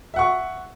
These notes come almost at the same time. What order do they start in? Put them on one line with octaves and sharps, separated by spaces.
E5 F#5 C#6